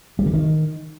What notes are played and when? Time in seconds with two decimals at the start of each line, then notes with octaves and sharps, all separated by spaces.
0.19 G3
0.26 D3
0.33 D#3